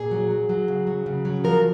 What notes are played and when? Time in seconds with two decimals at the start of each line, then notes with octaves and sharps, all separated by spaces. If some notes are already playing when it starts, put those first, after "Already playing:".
Already playing: A#2 G#4
0.11 F#3
0.31 F#3
0.49 F#3
0.68 C#3
0.87 F#3
1.06 C#3
1.25 F#3
1.44 F3 A#4